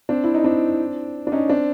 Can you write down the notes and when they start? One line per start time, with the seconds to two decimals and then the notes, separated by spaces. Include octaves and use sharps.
0.09 C4 D4
0.24 E4
0.34 D#4
0.44 C4 D4
1.27 D4
1.32 C#4 D#4
1.49 C4 D4